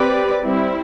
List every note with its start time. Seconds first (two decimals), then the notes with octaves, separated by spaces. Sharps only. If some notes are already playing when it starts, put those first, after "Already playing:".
Already playing: C4 G4 B4 D5
0.44 G3 C4 E4